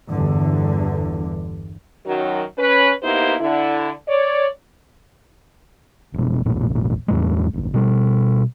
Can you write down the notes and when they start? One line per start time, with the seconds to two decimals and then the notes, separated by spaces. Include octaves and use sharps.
0.10 G1 E2 D3
2.05 F#2 D#3 F#3
2.58 C#4 B4
3.03 A#3 B3 D#4 E4 G4 C5
3.40 D3 E4
4.08 C#5 D5
6.14 F1 B2
6.45 E1 A1 A#2
7.08 E2 A2 G#3
7.53 D#1 G#1
7.74 B2 G3